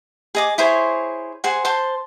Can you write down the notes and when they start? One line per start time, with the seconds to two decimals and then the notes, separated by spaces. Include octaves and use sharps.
0.35 G#4 D#5 D6
0.58 E4 G#4 C5 C#5
1.44 G#4 C5 F#5
1.65 C5 A5 C6